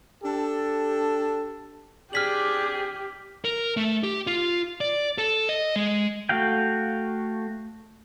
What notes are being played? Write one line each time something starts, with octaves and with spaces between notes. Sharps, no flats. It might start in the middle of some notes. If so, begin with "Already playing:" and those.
D4 G4 A4
C4 D4 G4 G#4 F6 B6 F#7
A#4
A3
G4
F4
D5
A4
D#5
G#3
A3 F#4 F5 G5